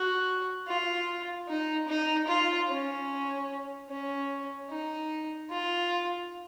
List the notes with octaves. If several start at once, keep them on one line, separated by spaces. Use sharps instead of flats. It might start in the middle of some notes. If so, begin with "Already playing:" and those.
Already playing: F#4
F4
D#4
D#4
F4
C#4
C#4
D#4
F4